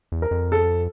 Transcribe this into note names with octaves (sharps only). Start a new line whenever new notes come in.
E2
A#4
F2
A4